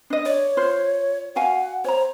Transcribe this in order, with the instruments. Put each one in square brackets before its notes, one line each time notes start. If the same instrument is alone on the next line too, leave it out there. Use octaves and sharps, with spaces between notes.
[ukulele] D4 D#5
[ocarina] C#5 [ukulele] D5
[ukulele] F4 C5
[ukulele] F#4 F5 G#5 [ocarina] F#5
[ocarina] C5 [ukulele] C#5 A#5